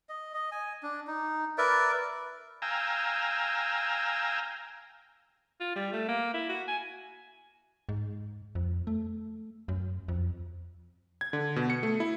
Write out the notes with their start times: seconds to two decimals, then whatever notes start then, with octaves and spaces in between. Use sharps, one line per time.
0.09 D#5
0.34 D#5
0.52 G#5
0.83 D4
1.07 D#4
1.58 A#4 B4 D5 E5
2.62 F5 G5 G#5 A#5 E6
5.61 F4
5.76 G3
5.93 A3
6.09 A#3
6.34 E4
6.49 F#4
6.68 G#5
7.89 G#2
8.55 F2
8.87 A3
9.68 F#2
10.08 F2
11.21 G#6
11.33 D3
11.56 B2
11.70 C#7
11.83 A3
12.00 E4